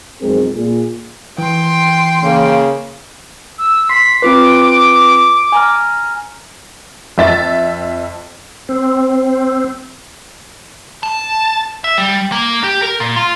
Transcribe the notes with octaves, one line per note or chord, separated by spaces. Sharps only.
B1 F2 G#3 C4 G#4 A#4
A#2 G#4
E3 G5 C6
C#3 A#3
E6
C6 B6 C7
C4 F4 B4 D6
G#5 A#5 F6
F2 E5 A6
C4
A5
E5
G3
A#3
G4
A#4
A#2
F4